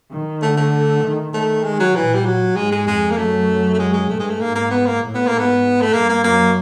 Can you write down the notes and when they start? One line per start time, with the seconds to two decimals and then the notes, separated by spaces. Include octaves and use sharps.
0.11 D#3
0.42 D3 A3
0.57 A3
1.03 D#3
1.33 D#3 A3
1.64 G#3
1.79 F#3
1.95 A#2 E3
2.14 G3
2.25 F#3
2.56 G#2 G#3
2.72 G#3
2.87 F2 G#3
3.11 A#3
3.17 F#2 A3
3.74 A3
3.79 G#3
3.94 G#3
4.09 G2 A3
4.19 G#3
4.30 A3
4.40 G#2 A#3
4.55 A#3
4.71 B3
4.86 A#3
5.01 A2
5.14 B3
5.27 G#2 A#3
5.39 B3
5.81 A3
5.93 G2 A#3
6.09 A#3
6.24 F#2 A#3